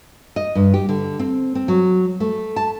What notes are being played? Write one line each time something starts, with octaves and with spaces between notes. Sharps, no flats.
D#5
G2
G4
D3
C4
C4
F#3
A3
A5